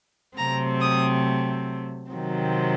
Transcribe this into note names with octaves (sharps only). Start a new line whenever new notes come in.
C3 F#3 A3 C4 A#5
D#6
C3 D#3 F#3 C4